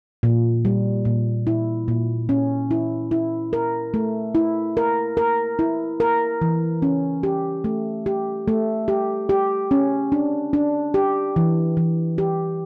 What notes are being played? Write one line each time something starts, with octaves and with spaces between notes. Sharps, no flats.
A#2
G3
A#2
E4
A#2
C#4
E4
E4
A#4
A3
E4
A#4
A#4
E4
A#4
E3
C#4
G4
A3
G4
A3
G4
G4
C#4
D4
D4
G4
E3
E3
G4